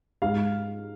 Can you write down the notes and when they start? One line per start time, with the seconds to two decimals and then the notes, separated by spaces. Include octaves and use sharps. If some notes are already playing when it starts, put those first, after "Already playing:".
0.22 G#2 F5